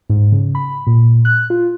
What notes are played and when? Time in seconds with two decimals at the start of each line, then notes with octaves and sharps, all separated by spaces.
0.10 G#2
0.32 C#3
0.55 B5
0.87 A#2
1.25 F#6
1.50 F4